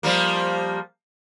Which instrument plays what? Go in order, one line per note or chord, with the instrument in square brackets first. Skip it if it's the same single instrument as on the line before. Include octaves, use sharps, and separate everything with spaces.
[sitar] F3 G3 A#3